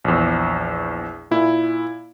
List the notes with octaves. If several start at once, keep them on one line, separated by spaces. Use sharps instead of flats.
A#1 E2
A#2 E4